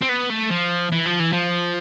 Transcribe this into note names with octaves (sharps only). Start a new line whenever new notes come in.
C4
B3
A3
F3
E3
F3
E3
F3